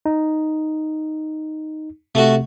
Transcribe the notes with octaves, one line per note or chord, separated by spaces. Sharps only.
D#4
C3 A3 F#4